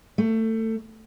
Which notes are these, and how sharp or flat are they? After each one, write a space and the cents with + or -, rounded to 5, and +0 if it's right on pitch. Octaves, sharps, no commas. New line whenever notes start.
A3 +25